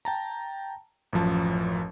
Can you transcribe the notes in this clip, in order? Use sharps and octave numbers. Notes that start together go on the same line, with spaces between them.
G5 A5 A#5
A1 F#2 F3 A5